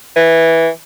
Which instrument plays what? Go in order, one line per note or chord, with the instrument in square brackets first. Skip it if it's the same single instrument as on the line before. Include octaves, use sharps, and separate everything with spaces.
[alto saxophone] E3